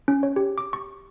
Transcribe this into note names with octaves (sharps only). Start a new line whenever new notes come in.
C#4
C#5
G4
D6
C#6